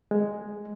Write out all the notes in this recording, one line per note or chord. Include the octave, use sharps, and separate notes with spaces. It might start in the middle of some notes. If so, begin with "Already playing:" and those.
G#3